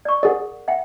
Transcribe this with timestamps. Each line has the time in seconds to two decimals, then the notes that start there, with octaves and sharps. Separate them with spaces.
0.05 D5 C#6
0.23 G#4 A#4 D5 F#5
0.68 E5 F#5 G5